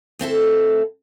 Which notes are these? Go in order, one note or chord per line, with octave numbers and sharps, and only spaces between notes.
D2 C4 E4 A4